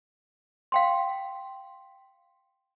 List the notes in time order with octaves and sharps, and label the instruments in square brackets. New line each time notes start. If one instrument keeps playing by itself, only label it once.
[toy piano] F5 G5 C6